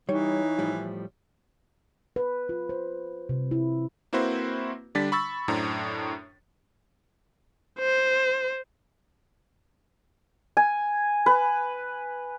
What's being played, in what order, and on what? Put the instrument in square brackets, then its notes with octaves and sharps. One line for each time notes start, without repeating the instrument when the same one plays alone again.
[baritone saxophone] E3 [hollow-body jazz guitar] G3 [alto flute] D#4 [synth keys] C#5
[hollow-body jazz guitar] A2 F3 G3
[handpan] B4
F4
C5
C3
E4
[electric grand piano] A#3 C4 E4 F#4 B4 C5
D3 G3 D4 A6 B6
B5 C#6 E6 A6
F#2 A2 D4 C5 A#5
[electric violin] C5
[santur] G#5
B4